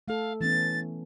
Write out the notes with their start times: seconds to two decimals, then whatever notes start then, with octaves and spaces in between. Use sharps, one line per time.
0.08 A3 A4 F5
0.41 E3 B3 C#4 A6